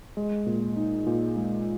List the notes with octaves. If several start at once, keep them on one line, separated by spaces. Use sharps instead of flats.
G#3
A#2
D#4
A#2
G#3